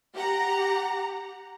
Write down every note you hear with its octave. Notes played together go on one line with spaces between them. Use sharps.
G4 F#5 A#5